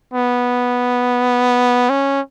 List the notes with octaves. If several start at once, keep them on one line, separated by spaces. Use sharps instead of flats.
B3
C#4